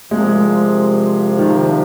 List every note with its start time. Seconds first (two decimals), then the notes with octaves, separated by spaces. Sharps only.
0.11 C2 C3 F3 G#3
1.39 D#3